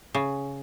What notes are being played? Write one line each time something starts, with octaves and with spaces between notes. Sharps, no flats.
C#3